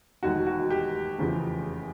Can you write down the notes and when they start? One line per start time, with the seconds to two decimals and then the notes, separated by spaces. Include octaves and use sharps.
0.23 E1 D#2 D#3 F#4
0.47 F#4
0.70 G4
1.18 F1 E2 C#3 F3